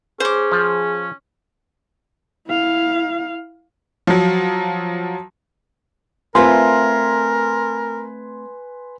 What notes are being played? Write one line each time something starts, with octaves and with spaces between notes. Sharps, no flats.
C#4 G#4 C5 D6
F3
E4 F5
F3 F#3
A3 C4 F4 A#4 B4 G#5 C6